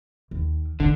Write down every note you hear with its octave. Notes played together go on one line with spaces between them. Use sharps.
D#2
D3 D#3